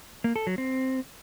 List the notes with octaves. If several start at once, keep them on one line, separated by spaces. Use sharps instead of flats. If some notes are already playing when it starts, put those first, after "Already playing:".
A#3
A4
F#3
C4